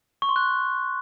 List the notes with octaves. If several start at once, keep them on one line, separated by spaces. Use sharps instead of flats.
C#6
C6
F#6